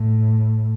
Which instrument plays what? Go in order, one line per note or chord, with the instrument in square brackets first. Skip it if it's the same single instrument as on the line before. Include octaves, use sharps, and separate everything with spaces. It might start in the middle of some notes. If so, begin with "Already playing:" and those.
Already playing: [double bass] A2